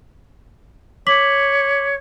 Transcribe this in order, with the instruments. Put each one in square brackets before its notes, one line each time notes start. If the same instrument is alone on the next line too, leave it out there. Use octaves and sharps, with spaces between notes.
[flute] C#5 [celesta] D6 B6 F#7